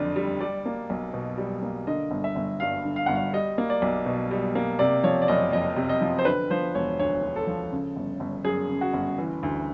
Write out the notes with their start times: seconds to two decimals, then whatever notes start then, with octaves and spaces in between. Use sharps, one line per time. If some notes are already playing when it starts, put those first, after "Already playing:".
Already playing: F#1 F2 D3 D5
0.16 G3
0.41 G3 D5
0.66 A#3
0.90 B1
1.14 B2
1.38 G3
1.62 A#3
1.87 D3 D#5
2.11 G1
2.24 E5
2.36 G1
2.60 G2 F5
2.85 D3
2.96 F5
3.06 G1 F#5
3.15 F5
3.34 G3 D#5
3.58 A#3
3.70 D5
3.82 B1
4.06 B2
4.31 G3
4.55 A#3
4.79 C3 D5
5.03 F3 C#5
5.22 D5
5.28 F#1 D#5
5.53 F2 D#5
5.76 C3
5.89 D#5
6.01 F3
6.19 C5
6.25 D3 B4
6.50 F3 C5
6.75 E1 C#5
6.99 D2 C#5
7.23 D3
7.36 A4
7.47 F3
7.72 C#3
7.96 G1
8.20 G1
8.45 F#2 G#4
8.69 C#3
8.81 F#4
8.93 G1
9.18 E3
9.43 D2